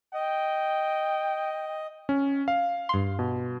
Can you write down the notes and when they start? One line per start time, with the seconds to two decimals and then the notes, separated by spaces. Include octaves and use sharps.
0.14 D#5 G5
2.09 C#4
2.48 F5
2.89 G2 C6
3.19 B2